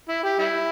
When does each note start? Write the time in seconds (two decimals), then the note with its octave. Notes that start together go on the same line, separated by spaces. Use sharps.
0.09 E4
0.24 G4
0.39 G3 E4